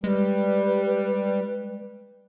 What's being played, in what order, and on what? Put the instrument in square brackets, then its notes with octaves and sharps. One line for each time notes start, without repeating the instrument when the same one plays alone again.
[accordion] G3 [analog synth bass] G#3 [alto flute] B4